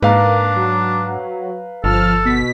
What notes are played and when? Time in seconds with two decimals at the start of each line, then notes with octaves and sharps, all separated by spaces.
0.02 G#2 A#3 D4 B4 F5 A#5
0.56 F#3
1.84 G1 F3 A4 A5 F6
2.25 B2 B6